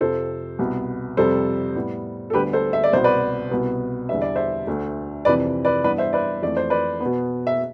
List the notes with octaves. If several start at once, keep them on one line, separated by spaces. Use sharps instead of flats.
F2 C3 F3 A4 C5
C2 B2 B3
F2 C3 G3 A4 C5
A2 G3 B3
A4
D2 D3 G3 B3 G4 B4
A4 C5
E5
D5
C2 B2 B3 C5
B4 D5
C2 B2 B3
E2 D3 G3 B3 E5
D5
C5 E5
D2 D3 A3
F2 C3 E3 B4 D5
B4 D5
G2 E3 B3 B4 D5
C5 E5
B4 D5
F2 E3 A3 D5
C5
B4 D5
B3
B2
E5